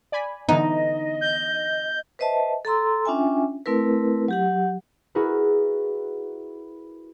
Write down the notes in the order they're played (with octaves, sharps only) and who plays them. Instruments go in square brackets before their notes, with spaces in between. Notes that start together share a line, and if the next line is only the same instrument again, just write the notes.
[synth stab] D5 G#5 B5
[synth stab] D3 E3 B3 [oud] D#4 [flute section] D#5
[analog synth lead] G6
[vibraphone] B4 C5 D#5 E5 A5
A4 A#5 C6 E6
C#4 D4 F4 E5 G5 G#5
A3 C4 E4 A#4 B4
F#3 G4 F#5
[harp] E4 F#4 G#4 A#4 B4